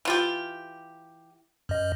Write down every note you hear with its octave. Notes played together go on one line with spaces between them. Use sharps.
E3 F4 G4
F#2 D#5